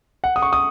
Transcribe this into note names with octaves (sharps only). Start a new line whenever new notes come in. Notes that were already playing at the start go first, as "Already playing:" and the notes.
F#5
D#6
C#6
D#6